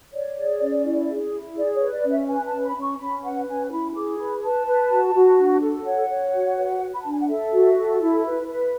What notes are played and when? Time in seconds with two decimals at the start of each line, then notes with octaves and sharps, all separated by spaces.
0.13 C#5 D5
0.37 G#4
0.60 C#4
0.84 E4
1.09 G#4
1.32 E4
1.56 G#4 D5
1.74 C#5
1.81 B4
1.92 D5
2.03 C#4
2.10 E5
2.27 B4 G#5
2.46 A5
2.52 C#4
2.64 B5
2.76 C#4
2.81 C#6
2.99 C#4 B5
3.23 B4 F#5
3.47 C#4 G#5
3.70 E4 B5
3.95 G#4 D6
4.19 B4 B5
4.43 B4 A5
4.66 B4
4.90 F#4
5.15 F#4
5.38 D4
5.61 A4
5.85 C#5 F#5
6.10 C#5
6.33 F#4
6.57 B4
6.81 B4
6.93 B5
7.01 D4 A5
7.11 G#5
7.20 F#5
7.28 A4 E5
7.52 F#4
7.76 A4
8.00 E4
8.25 B4
8.47 B4